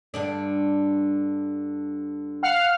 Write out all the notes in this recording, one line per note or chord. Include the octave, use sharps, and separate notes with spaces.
G2 D3 D4
F5 F#5 F6